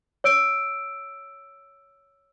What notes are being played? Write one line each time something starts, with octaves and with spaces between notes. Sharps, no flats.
C#5 E6 D7